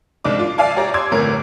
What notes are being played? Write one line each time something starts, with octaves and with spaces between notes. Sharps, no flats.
C2 G#2 D4 D6
F4
D5 E5 F5 G#5 A5
G4 C#5 D5 A#5
C6 D6 E6 G#6
G1 A2 A#4 C#5